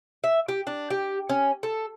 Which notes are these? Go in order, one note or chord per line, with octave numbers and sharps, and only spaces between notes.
E5
G4
D4
G4
C#4
A4